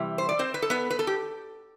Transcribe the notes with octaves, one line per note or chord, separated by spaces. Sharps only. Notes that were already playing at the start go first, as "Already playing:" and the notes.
Already playing: C3 E3 G3
C5
D5
C4 C5
B4
A4
B3 B4
B4
A4
G4